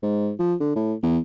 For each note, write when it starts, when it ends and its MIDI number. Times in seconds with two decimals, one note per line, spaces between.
0.03 0.32 44
0.39 0.54 53
0.60 0.73 50
0.76 0.93 45
1.03 1.18 40